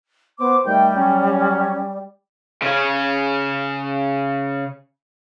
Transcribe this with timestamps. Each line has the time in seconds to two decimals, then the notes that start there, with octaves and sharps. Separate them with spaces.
0.39 B3 C5 D6
0.65 D#2 G3 A3 G5
0.96 F#3 C#4
2.62 C#3 C#4